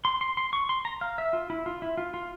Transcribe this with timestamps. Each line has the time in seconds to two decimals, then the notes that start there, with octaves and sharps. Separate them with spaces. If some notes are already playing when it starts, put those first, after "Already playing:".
0.05 C6
0.21 C6
0.37 C6
0.53 C#6
0.69 C6
0.85 A#5
1.01 F5
1.18 E5
1.33 F4
1.50 E4
1.66 F4
1.82 E4
1.97 F4
2.14 F4